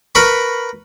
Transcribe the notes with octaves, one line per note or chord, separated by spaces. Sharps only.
A#4 B4 B5 C#6